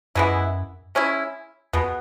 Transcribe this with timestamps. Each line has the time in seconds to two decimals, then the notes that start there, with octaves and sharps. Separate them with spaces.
0.15 F#2 E3 G#3 B3 E4
0.95 G#3 C#4 E4
1.73 E2 B2 G#3 B3